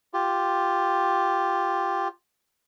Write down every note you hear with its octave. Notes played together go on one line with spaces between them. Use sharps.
F4 G4